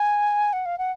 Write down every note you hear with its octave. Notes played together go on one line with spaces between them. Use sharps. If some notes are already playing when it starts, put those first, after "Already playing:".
Already playing: G#5
F#5
F5
F#5